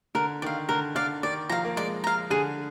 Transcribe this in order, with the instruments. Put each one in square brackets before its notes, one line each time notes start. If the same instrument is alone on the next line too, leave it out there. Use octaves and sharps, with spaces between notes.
[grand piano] D3 [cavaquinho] A#4
[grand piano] D#3 [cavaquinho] D5 F5
[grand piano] D3 [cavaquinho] A#4
[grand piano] D3 [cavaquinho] D5 F5
[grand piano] D#3 [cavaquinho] D5
[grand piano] F3 [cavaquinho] F5 A#5
[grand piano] A#3
[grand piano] G#3 [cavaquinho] D5
[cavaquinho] F5 A#5
[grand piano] D3 [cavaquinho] G#4